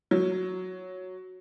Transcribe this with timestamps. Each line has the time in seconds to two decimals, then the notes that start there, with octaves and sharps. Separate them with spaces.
0.11 F#3